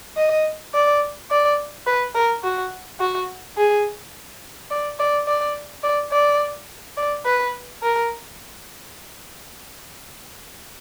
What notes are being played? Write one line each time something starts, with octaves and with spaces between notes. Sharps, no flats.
D#5
D5
D5
B4
A#4
F#4
F#4
G#4
D5
D5
D5
D5
D5
D5
B4
A#4